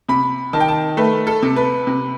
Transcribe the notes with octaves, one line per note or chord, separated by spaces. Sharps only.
C3 B5
D#3 A5
G5
A5
A3 B4
A4
C3
B4
C3